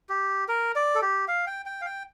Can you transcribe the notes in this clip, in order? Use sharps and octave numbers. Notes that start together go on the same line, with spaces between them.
G4
A#4
D5
A4
G4
F5
G5
G5
F5
G5